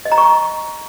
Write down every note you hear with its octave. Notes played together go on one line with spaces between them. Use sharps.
D#5
A#5
C#6